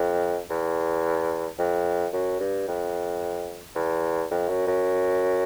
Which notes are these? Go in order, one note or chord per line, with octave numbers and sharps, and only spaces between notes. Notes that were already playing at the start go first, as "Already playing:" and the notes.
Already playing: F2
E2
F2
F#2
G2
F2
E2
F2
F#2
F#2